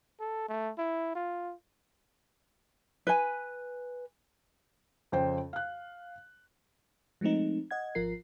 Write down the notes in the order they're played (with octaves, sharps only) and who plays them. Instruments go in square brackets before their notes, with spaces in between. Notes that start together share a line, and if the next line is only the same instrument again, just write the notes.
[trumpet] A4
A3
E4
F4
[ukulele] B4 G#5
[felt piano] F2 C#3 C5 G5
F5 F#6
[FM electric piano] F3 G#3 A3 C4 D#4
D#5 F#5 G#6
G#1 F3 F4 A#4 C7